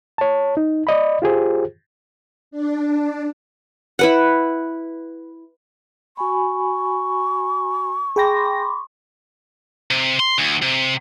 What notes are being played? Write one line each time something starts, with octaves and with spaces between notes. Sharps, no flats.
C#5 A5
D#4
D5 D#5 B5
F4 G4 G#4 C5
D4
E4 B4 F#5
F#4 G#5 B5 C#6
G#4 G5 B5 C6 D6 A#6
C3
C6
D2
C3